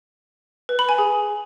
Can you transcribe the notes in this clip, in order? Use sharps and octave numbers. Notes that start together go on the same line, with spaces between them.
B4
B5
G#5
G#4